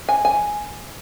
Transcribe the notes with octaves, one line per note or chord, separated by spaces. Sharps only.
G#5
G#5